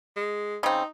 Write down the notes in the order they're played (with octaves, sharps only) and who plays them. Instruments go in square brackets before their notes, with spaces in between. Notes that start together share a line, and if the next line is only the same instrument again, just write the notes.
[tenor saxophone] G#3
[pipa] C#3 C4 [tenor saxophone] D#4